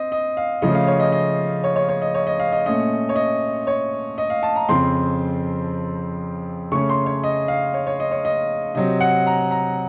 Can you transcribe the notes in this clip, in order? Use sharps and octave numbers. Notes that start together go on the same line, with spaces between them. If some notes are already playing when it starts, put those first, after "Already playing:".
Already playing: C4 D#5
D#5
F5
C#3 F3 A3 C#4 D#5
F5
C#5
D#5
D#5
C#5
C#5
C#5
D#5
C#5
D#5
F5
D#5
A#2 A3 C#4 D#5
C#5
D#5
C#5
D#5
F5
A5
A#5
F2 C#3 F3 C4 C6
C#3 A3 C#4 C#6
C6
C#5
D#5
F5
C#5
C#5
D#5
C#5
D#5
C3 F#3 C4 D#5
F#5
A#5
A#5